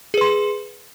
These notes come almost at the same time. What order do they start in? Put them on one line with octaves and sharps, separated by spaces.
G#4 B4 C6